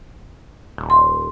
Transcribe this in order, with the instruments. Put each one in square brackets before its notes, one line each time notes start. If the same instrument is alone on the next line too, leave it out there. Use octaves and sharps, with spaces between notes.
[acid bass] D#1
[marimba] C6